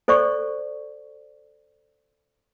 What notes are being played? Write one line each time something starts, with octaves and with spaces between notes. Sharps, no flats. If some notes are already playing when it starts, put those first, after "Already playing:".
A4 C5 D5 C#6